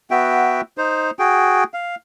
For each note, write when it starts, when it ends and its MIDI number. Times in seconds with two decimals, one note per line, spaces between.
0.11 0.61 59
0.11 0.61 66
0.11 0.61 76
0.11 0.61 79
0.78 1.11 63
0.78 1.11 72
1.19 1.64 66
1.19 1.64 68
1.19 1.64 79
1.74 1.95 77